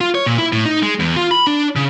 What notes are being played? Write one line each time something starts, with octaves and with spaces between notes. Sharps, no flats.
F4
C#5
A#2
E4
A2
D#4
G#3
E2
F4
B5
D4
C#3